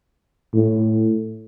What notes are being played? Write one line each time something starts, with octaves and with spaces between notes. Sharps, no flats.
A2